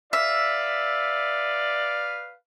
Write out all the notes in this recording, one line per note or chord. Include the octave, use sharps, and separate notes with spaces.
B4 D5 E5 F5